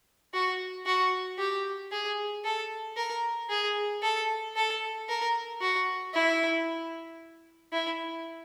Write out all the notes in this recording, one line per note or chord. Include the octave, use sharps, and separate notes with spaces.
F#4
F#4
G4
G#4
A4
A#4
G#4
A4
A4
A#4
F#4
E4
E4